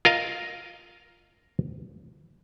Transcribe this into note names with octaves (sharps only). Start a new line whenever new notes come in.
F4 A#4 D#5 F5